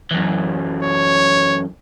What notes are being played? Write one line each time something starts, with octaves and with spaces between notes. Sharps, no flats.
F#2 E3
C#5